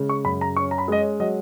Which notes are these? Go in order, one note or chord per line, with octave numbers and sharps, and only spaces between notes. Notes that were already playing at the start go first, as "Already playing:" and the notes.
Already playing: C#3 G#3
C#6
F#2 B5
A#5
C#4 C#6
A#5
B5
G#3 D#5
C#5
F#3 D#5